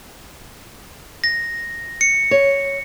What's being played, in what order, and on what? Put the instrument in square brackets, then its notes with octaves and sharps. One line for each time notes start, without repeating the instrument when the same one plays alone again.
[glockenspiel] A#6
C#7
[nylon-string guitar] C#5